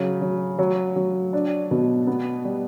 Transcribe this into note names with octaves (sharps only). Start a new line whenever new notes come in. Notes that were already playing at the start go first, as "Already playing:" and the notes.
Already playing: C#3 F#3
F#3
F#3
F#3
D4
B2
B3
G3